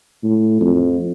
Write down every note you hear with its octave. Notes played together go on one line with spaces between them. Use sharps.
A2
F2